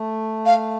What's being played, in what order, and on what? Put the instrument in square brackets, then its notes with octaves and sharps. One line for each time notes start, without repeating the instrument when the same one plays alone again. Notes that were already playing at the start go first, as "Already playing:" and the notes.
Already playing: [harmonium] A3
[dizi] F5